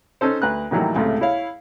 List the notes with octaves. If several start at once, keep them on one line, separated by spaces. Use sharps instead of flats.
C#4 D#4 A4 C5
D2 B4 A#5 F#6
A2 D#3 E3 F#3 G3 A#3
C#2 A2 C3 A3
E4 C#5 F5